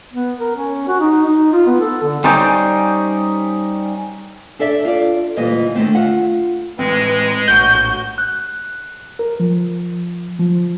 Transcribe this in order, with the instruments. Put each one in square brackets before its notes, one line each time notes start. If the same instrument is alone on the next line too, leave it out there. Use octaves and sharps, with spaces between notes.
[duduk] B3
A#4
C#4
F#4
D#4
D#4
F4
B3
A4
D3
[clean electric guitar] G3 C#4 D#4 C5 D5
[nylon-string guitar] D4 A4 D5 E5
F4 D5
D2 A#2 E3 G3 D#5
D3 D#3 A3 C4
F4 F#5
[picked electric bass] A2 E3 C4 [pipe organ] G#3 [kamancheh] B4
[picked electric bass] A#1 A2 [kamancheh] F#4 [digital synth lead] G6
[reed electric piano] F#6
A#4
F3
F3